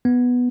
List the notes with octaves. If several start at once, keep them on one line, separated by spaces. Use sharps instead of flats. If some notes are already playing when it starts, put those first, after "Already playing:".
B3